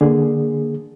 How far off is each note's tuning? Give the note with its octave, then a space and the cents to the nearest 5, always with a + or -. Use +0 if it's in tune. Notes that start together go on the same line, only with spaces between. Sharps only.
D3 +0 A#3 +0 G#4 +0